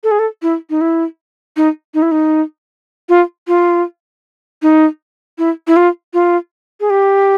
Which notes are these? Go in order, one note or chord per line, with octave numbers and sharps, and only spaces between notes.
A4
G#4
A4
E4
D#4
E4
D#4
D#4
E4
D#4
F4
F4
D#4
E4
E4
F4
F4
G#4
G4